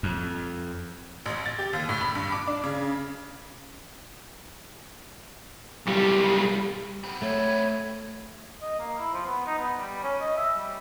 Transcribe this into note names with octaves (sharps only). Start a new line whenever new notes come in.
F2
A1
A6
G4
D#2
A2
B5
G2
D6
D4
C#3
B1 G3
B3 C4
A3 C#5
D#5
A#3
E4
F3
B3
D#4
B3
G3
C#4
D#5
E5
G3